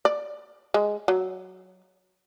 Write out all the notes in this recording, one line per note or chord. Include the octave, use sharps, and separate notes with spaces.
D5
G#3
F#3